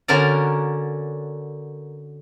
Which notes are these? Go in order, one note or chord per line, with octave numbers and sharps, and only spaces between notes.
D3 C#4 F#4 A#4 D5 A#5